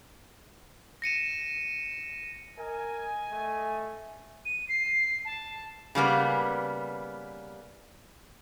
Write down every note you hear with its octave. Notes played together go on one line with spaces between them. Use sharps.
A#6 C#7 D#7 E7
A#4 D#5 G#5
A3
D#7
C7
A5
C#3 G3 A#3 B3